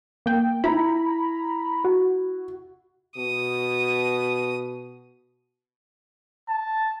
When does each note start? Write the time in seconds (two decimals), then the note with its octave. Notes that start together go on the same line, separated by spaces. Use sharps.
0.26 A#3 G5
0.64 E4 A#5 B5
1.85 F#4
3.17 B2 D#6
6.49 A5